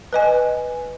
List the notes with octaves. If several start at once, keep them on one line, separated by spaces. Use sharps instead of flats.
B4 D#5 G#5